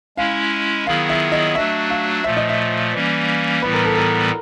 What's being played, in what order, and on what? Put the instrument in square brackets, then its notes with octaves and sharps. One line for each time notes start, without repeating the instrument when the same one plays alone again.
[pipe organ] G#3 C#4 E4 [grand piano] F5
[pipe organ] D#3 F#3 B3 E4 G#4 [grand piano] F5
[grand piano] E5
D#5
[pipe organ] F#3 A3 D4 F#4 [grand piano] E5
[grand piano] F5
[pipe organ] A#2 F3 A3 [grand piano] E5
[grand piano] D#5
E5
[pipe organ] E3 G3 A#3 C#4
[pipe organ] A2 E3 G3 B3 [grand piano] B4
[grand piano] A#4
A4
A#4